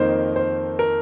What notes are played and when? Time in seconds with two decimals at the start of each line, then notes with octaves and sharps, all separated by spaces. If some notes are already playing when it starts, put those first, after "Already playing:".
Already playing: F2 D#3 A#3 D#4 C5
0.36 C5
0.79 A#4